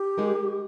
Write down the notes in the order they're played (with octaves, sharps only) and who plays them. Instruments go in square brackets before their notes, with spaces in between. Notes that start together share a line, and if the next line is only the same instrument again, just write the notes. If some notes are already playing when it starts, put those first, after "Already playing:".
Already playing: [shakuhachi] G4
[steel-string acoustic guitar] G#3 D#4 A#4